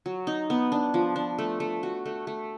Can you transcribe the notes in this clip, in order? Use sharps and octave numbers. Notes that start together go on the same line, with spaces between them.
F#3
D#4
B3
D4
F3
D4
A3
A3
F#4
A3
A3